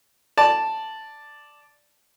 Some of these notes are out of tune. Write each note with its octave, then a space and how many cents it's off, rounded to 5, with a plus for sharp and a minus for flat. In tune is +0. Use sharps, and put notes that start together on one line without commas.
D5 +0 A5 +0